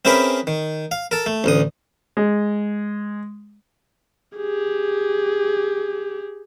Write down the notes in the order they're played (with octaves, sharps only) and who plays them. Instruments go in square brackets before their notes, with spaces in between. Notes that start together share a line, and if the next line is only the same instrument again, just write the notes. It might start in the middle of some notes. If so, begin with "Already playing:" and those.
[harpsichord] C4 C#4 E4 G#4 A#4 B4
D#3
F5
A4 A#4
A3
A1 D2 D#6
[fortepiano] G#3
[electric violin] G4 G#4